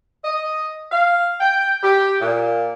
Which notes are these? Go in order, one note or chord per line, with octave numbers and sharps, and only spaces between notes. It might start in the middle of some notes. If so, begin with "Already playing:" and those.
D#5
F5
G5
G4
A#2